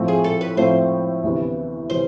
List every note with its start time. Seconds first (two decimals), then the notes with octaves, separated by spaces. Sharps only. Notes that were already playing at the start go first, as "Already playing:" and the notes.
Already playing: A2 F3 A3 C4
0.08 G#4
0.24 A4
0.41 B4
0.57 A2 F3 A3 C4 C5
1.23 D2 C3 E3 B3
1.89 C3 E3 B3 C5